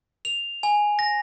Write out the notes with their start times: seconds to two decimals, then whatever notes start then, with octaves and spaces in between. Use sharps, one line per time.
0.25 F7
0.63 G#5
0.99 A#6